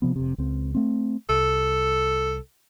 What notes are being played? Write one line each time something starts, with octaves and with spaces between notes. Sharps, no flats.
C3 F3 B3
F1 C3
C#2 C4
A3 C4
C2 A4